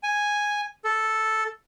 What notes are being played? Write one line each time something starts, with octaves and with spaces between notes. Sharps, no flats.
G#5
A4